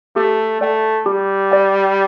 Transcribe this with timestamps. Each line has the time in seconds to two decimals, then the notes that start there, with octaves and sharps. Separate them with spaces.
0.16 A3 G4
0.61 A3 D5 G5
1.06 G3 G4
1.52 D5 G5